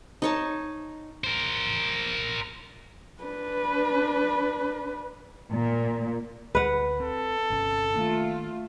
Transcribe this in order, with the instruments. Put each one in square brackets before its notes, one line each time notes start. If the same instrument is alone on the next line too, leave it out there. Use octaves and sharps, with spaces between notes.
[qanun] D#4 C#5 A5
[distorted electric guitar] A#4 C5
[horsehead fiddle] D4 B4
[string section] A#2
[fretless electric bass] D2 [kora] B4 F#5
[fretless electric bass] C4 [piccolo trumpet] A4
[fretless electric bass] G1 C3 C#4
[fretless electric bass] D#3 A#3 D4 [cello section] A3 F4